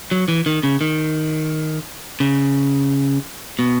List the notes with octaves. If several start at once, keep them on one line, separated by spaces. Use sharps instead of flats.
F#3
E3
D#3
C#3
D#3
C#3
B2